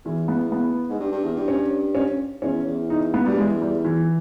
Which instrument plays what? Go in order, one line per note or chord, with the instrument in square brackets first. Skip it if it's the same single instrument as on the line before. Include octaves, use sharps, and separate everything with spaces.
[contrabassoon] E2 [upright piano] E3
[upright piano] B3
B3
[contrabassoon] G#2
G2
G2
E2
G2
[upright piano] C#4
C#4
[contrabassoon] E2 [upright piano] C#4
[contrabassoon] E2
[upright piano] D#4
B3
[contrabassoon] G2 [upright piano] G3
[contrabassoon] E2 [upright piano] G#3
[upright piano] G3
E3